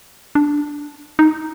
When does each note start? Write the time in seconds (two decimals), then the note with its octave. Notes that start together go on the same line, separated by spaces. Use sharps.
0.35 D4
1.19 D#4